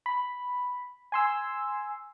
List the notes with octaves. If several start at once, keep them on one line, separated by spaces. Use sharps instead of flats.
B5
G#5 C6 E6